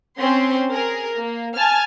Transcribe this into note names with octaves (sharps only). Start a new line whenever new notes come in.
C4 C#4 C6
G#4 A#4
A#3
G#5 A5 F6